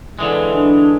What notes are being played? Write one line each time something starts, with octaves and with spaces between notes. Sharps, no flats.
D3 E3 G#3
D4